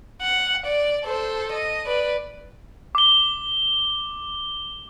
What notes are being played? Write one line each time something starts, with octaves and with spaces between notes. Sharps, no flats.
F#5
D5
A4 C5
D#5
B4 D5
D6 G7